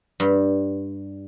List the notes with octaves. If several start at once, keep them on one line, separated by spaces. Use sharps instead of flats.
G2